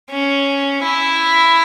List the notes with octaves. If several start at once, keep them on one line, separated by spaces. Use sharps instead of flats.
C#4
E4